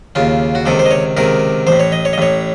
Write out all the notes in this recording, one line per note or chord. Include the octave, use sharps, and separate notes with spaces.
D#2 C#3 F4
F#4
C#2 C3 D#3 A4
C5
D#5
C#5
C#2 C3 D#3 A#4
A1 C5
A2
C#5
D#5
C#5
D#5
A1 A2 C#5